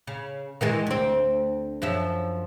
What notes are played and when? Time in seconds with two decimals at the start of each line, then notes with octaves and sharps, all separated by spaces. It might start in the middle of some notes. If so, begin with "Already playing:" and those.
0.07 C#3
0.61 D#3 E3 G#3
0.87 D2 C4
1.82 F#2 F3 E5